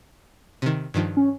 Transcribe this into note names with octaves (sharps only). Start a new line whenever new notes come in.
C3 D#3
G2 D#3 F3
C#4